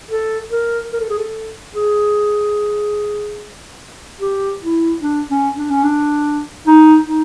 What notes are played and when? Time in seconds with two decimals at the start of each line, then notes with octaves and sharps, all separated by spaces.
0.11 A4
0.52 A#4
0.93 A#4
1.00 A4
1.09 G#4
1.18 A4
1.74 G#4
4.21 G4
4.62 E4
5.03 D4
5.30 C#4
5.58 D4
5.70 C#4
5.84 D4
6.67 D#4
7.08 D#4